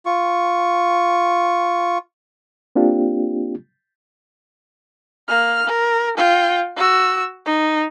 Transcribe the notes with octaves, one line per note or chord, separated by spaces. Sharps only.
F4 C#6
A#3 C4 D4 F4 G4
A#3 F6
A#4
F4 G5
F#4 E6
D#4